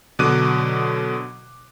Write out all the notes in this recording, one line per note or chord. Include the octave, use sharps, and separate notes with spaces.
B2 D3 F#3 D6 F#6 D#7